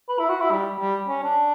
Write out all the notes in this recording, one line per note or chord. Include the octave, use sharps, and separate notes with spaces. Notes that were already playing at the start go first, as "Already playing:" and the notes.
B4
E4
F#4
E4
G3
G3
C#4
D4